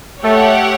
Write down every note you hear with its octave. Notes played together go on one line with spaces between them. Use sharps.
A3 G4 C#5 F#5